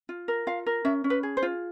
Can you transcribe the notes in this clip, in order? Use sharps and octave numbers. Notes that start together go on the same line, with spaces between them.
F4
A#4
F4 F5
A#4
C#4 E5
C#4
B4
G#4
C5
F4